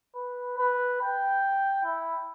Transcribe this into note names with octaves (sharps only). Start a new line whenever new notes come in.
B4
B4
G5
E4